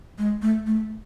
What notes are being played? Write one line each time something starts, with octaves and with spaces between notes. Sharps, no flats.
G#3
A3
A3